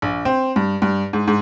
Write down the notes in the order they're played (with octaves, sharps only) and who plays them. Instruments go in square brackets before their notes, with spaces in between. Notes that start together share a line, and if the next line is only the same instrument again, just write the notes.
[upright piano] A#1
C4
G2
G2
G#2
G#2